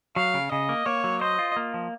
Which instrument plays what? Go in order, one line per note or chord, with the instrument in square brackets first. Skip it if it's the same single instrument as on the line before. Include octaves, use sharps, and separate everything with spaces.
[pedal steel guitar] F#3 [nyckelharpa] F5
[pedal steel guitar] C#3
[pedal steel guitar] C#3 [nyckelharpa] D#5
[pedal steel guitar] A#3
[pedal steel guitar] A#3 [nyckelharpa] C#5
[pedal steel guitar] F#3
[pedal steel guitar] C5 [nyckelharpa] D#5
[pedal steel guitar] F4
A#3
F3